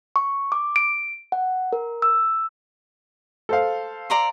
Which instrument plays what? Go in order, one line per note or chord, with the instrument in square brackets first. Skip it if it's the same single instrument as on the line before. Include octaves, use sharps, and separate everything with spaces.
[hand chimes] C#6
D6
D7
F#5
A#4
E6
[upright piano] A4 C5 F5
[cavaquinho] D5 A#5 C6